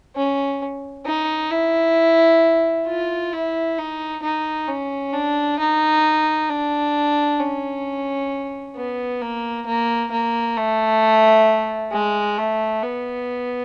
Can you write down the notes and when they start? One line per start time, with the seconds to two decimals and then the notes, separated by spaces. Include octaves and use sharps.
0.16 C#4
1.06 D#4
1.51 E4
2.87 F4
3.33 E4
3.78 D#4
4.23 D#4
4.68 C#4
5.13 D4
5.59 D#4
6.49 D4
7.40 C#4
8.76 B3
9.22 A#3
9.66 A#3
10.12 A#3
10.56 A3
11.93 G#3
12.38 A3
12.83 B3